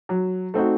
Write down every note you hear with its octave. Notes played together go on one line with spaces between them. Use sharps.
F#3
A3 C4 D#4 F#4